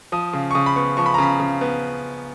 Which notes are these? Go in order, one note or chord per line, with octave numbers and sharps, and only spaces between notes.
F3 D#6
C#3
C#6
C#3 D#6
B5
B3 C#6
F3 C#6
B5
A#5
C#3 B5
C#3
B3